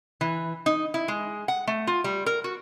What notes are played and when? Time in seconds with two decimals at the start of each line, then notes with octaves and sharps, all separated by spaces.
0.21 E3
0.66 D#4
0.94 E4
1.08 G#3
1.48 F#5
1.67 A3
1.87 F4
2.04 G3
2.26 A#4
2.44 F#4